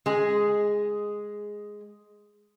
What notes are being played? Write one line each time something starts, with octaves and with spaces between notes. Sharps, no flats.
G#3 G#4